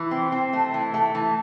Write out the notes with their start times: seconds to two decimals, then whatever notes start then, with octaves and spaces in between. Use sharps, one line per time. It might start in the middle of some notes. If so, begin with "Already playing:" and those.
Already playing: E3
0.11 C4
0.32 C4
0.53 A3
0.74 E3
0.94 A3
1.15 E3